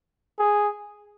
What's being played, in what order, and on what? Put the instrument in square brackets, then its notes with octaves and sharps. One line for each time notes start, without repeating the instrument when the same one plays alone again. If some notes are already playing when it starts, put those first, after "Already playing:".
[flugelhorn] G#4